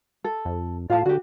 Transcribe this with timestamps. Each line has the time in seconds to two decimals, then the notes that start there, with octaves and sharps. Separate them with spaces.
0.24 A4
0.45 F2
0.90 A2 F4 F5 A5
1.06 D3 F#4 G4